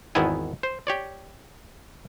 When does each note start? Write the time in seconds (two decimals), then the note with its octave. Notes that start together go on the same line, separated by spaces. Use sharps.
0.15 G#1 E2 D#3 B3 E4 G#5
0.63 C5
0.87 G4 C#5 D5